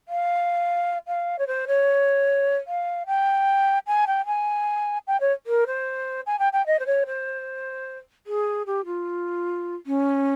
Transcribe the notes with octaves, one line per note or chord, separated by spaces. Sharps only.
F5
F5
C#5
C5
C#5
F5
G5
G#5
G5
G#5
G5
C#5
A#4
C5
G#5
G5
G5
D#5
C5
C#5
C5
G#4
G4
F4
C#4